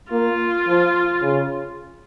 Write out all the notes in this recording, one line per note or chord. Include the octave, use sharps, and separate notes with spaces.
A#3 F4
F3
C#3